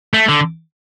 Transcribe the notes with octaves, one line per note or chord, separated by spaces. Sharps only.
A3
D3